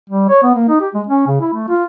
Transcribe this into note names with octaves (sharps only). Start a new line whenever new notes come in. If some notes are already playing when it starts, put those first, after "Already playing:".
G3
C#5
B3
A#3
D#4
G4
G#3
C#4
C#3
E4
A3
F4